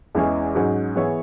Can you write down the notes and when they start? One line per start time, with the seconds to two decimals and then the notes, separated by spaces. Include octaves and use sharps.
0.15 E2 E3 G#3 C#4 G#4
0.55 G#2 F#3 C#4 G#4
0.96 E3 B3 E4 G#4 C#5